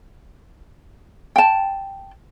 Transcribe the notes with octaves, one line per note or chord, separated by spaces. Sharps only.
G5 A5